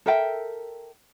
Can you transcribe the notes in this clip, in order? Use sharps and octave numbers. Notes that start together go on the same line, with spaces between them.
A4 A#4 E5 G5